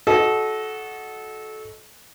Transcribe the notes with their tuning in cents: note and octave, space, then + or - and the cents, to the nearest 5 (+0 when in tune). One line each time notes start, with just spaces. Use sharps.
F#4 +0 A4 -25 D#5 +0